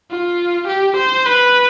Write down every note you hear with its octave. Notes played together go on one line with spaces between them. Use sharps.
F4
G4
C5
B4